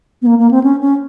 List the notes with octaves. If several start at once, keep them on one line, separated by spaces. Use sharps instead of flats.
B3
A#3
A#3
C4
C#4
C#4